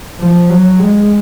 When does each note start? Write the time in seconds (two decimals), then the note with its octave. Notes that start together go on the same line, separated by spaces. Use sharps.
0.19 F3
0.50 F#3
0.80 G#3